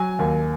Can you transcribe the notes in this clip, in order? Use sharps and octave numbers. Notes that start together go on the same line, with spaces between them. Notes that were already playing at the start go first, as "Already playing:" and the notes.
Already playing: F#3 G#5
D#2